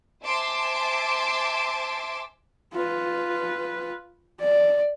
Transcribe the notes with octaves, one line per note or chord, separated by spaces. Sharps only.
C5 E5 G#5 A5 C6 D6
F4 B4
D5